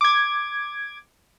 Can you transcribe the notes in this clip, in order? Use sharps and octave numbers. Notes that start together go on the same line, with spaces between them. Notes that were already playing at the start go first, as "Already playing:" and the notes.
D6 G#6